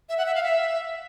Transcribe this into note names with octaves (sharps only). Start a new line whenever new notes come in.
E5
F#5
E5
F5
E5